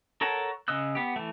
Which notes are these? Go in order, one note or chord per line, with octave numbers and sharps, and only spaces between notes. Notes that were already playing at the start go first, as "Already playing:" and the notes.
A4 A#4 C#5 F#5 A5
C#3 D#5 D#6 E6 F#6
B3 G4
E3 A3